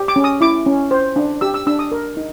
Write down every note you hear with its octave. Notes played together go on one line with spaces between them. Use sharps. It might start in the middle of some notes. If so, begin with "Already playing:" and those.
Already playing: G4
D6
C#4
D#6
E4 D6
C#4
C5
D4
G4 E6
E6
D4 E6
D#6
A#4
D#4